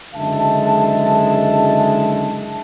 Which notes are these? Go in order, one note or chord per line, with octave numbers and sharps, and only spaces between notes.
F#1 D3 G#3 E5 A5